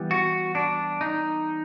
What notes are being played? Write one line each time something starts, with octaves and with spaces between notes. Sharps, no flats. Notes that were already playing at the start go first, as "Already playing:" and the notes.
Already playing: E3 G3 B3
F#4
D4
D#4